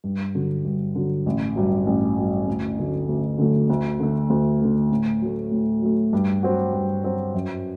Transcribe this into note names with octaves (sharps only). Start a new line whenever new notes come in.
G2
D3 F#3
G2
D3 F#3
A1
G2 F#3
A1
G2 F#3
D2
D3 F#3 A3
D2
D3 F#3 A3
D2
D3 A3
D2
D3 A3
A2
F#3 A3
A2
F#3 A3
G2
F#3 C4 F#4
G2
F#3 C4 F#4
F#2